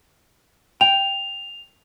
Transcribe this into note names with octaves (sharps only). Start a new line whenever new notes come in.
G5 F7